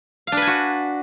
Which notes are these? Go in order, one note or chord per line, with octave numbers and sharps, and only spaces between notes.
D4 F#4 B4 F5 G#5